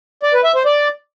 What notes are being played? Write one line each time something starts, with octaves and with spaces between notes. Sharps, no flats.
D5
B4
E5
C5
D5